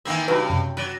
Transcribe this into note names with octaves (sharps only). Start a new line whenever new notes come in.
D#3 E3 A#3 C4 E5
G2 C#3 F#3 D#4 F#4 B4
F#2 C3
F#3 B4 D5